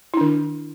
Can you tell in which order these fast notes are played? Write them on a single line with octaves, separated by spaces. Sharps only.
E4 D4 D#3